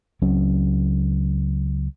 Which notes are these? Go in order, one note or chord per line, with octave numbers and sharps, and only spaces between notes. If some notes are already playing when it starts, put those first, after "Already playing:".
C#2 F#3 C4 C#4